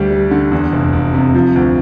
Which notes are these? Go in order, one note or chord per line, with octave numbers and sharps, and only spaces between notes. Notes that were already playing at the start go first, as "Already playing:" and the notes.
Already playing: D2 G3
G3
D3
E2
F1
F1
C3
F3
D2